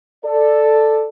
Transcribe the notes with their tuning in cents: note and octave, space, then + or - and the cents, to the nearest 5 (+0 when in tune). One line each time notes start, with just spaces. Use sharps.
A4 +0 D5 +10